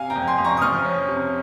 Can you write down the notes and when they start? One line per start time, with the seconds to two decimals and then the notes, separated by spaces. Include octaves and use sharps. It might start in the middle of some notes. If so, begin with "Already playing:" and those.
Already playing: C3 F5 G#5
0.10 G5 A#5
0.16 F2
0.27 G#5 C6
0.38 F2
0.44 A#5 C#6
0.57 D#6
0.62 F3 C#6 F6
0.85 C#4
1.08 C3